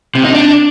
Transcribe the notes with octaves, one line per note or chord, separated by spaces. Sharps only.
C3
D#4
D4